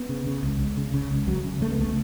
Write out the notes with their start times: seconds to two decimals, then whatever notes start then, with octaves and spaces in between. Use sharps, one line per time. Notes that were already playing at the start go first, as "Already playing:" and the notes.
Already playing: B3
0.09 C#3
0.27 C#3
0.43 C#2
0.59 C#2
0.77 C#3
0.94 C#3
1.11 C#2
1.27 C#2 F#3
1.44 C#3
1.61 C#3 A3
1.71 B3
1.78 C#2 A3